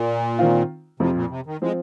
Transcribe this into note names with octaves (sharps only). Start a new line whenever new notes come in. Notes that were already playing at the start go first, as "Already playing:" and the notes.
Already playing: A#2
D#3 C4 F4
F2 C3 F3 C4
A#2
C3
D#3
F3 G#3 C4